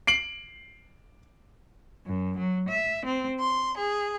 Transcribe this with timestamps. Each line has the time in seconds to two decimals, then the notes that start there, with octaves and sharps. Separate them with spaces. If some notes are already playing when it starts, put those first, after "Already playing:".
0.07 C7 D7 F#7
2.06 F#2
2.38 F#3
2.68 E5
3.05 C4
3.39 C6
3.76 G#4